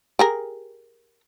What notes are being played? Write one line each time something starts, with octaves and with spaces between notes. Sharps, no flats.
G4 G#4 A#4